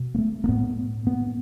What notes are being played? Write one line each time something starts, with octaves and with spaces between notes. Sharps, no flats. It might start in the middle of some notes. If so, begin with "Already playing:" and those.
Already playing: B2
A#3
A3
A#3
A2 B3
A2 B3